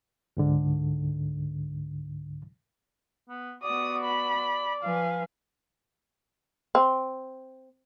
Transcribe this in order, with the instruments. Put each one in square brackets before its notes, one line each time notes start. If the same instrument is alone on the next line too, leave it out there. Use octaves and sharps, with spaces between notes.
[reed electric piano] C#2 G#2 D3
[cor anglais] B3
[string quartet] B3 F#4 [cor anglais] D5 [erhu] D#6
[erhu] B5
[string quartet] F3 B4 G#5 [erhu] F5
[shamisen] C4